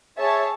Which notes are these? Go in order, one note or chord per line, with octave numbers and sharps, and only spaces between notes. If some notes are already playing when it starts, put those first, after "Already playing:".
G#4 C#5 E5 A5